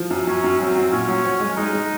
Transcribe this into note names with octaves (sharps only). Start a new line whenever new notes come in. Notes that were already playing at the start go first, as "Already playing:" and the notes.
Already playing: F3
F#2
F#2 C#4
F#2
F#3 C4
F#3
A#2 C#4
F#3
C#5
G#3
G#3 D#4
G#3